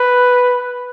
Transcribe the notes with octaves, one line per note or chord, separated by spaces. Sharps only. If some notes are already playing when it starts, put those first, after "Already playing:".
Already playing: B4